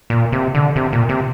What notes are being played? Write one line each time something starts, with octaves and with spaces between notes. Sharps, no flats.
A#2
C3
D3
C3
A#2
C3